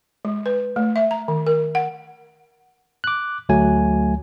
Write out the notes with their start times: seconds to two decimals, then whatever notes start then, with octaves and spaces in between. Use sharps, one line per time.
0.25 G#3
0.46 B4
0.76 A3
0.96 E5
1.11 A#5
1.28 D#3
1.47 A#4
1.75 F#5
3.04 D6 F#6
3.49 D2 F#3 A3 G#5